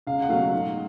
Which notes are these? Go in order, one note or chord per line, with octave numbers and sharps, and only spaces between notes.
C#2 F5
F#5
B2 F#3 A3 F5
G#2